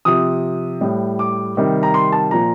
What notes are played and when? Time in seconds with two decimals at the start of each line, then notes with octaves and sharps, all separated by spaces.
0.05 C3 F3 D#6
0.81 A2 G3
1.19 D6
1.57 C3 D#3 G3
1.83 A#5
1.94 C6
2.12 A5
2.31 A#2 F3 A#5